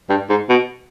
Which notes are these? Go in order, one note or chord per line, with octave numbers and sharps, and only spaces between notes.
G2
G#2
B2